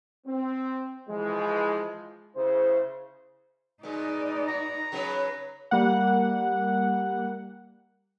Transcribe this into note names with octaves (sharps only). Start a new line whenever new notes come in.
C4
E3 F3 G#3
C#3 E4 C5
B2 G#3 D#4 D5
F#4 A#5
C#3 F#3 B3
G3 A#3 F#5